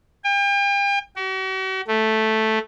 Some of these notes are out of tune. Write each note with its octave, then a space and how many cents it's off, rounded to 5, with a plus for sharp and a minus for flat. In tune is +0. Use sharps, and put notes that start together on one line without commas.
G5 +40
F#4 +45
A3 -5